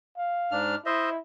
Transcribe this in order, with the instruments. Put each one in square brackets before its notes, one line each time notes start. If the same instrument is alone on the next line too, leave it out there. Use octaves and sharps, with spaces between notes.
[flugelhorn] F5
[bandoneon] G#2 D4 F6
[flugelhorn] E4 [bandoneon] C5 D#5 E5